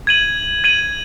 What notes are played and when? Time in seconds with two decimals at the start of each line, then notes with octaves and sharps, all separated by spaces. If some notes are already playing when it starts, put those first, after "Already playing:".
0.07 G#6 D#7 F#7
0.64 G#6 D#7 F#7